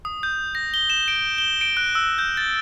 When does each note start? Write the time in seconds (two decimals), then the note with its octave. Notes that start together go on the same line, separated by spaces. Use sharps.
0.05 D#6
0.23 G6
0.55 A#6
0.74 G7
0.90 E7
1.08 D7
1.38 G7
1.61 D7
1.77 F#6
1.95 E6
2.18 G6
2.37 A6